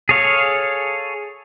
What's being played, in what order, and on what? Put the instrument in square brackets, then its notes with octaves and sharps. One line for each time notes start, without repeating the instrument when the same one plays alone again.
[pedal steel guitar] G#4 A4 C#5 F5